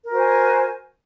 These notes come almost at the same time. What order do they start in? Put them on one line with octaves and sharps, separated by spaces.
A#4 F#4 C5 G#5